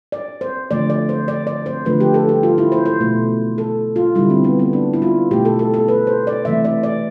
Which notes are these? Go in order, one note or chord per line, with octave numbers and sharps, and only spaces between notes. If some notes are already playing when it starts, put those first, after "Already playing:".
D5
C5
D3 F3 A3 D5
D5
C5
D5
D5
C5
D3 F3 A3 B4
G4
A4
G4
F4
E4
C5
C5
B2 A3
A4
F4
D3 G3 E4
C4
B3
B3
D4
E4
F4
B2 A3 G4
A4
A4
A4
B4
C5
D5
C3 E3 A3 E5
D5
D5